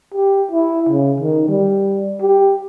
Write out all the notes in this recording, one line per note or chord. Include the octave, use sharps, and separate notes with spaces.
G4
E4
C#3
D#3
G3
G4